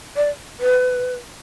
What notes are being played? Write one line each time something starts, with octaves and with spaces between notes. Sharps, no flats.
D5
B4